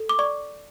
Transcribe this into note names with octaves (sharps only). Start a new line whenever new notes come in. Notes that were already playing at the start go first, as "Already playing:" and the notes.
Already playing: A4
D6
D5 C#6